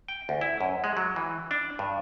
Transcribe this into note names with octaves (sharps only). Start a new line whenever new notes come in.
G5
D2
E4
F#2
G#3
F#3
E3
D4
G2